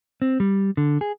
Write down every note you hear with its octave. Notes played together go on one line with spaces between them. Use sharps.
C4
G3
D3
G#4